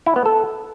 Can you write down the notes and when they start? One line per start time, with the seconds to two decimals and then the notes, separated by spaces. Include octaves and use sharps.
0.06 E4
0.16 B3
0.26 A4